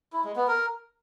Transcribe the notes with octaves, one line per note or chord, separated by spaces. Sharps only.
E4
G#3
B3
A#4